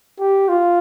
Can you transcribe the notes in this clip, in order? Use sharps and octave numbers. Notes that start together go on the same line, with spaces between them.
G4
F4